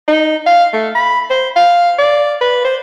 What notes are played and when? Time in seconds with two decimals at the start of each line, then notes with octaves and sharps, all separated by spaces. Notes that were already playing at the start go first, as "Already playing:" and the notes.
0.08 D#4
0.46 F5
0.73 A3
0.95 B5
1.30 C5
1.56 F5
1.98 D5
2.41 B4
2.65 C5